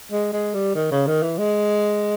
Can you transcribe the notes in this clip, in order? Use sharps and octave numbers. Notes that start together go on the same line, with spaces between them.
G#3
G#3
G3
D#3
C#3
D#3
E3
G#3